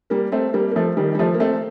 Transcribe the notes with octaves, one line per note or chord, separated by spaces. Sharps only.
G3 A#3
A3 C4
G3 A#3
A#3
F3 A3
D#3 G3
G3
F3 A3
A#3
A3 C4